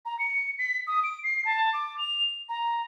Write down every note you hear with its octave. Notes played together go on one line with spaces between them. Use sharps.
A#5
C#7
B6
D#6
D7
C7
A5
D6
F7
A#5